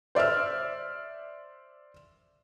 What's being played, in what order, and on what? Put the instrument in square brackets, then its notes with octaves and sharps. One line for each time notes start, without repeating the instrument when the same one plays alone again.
[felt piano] C5 D5 E5 E6 F6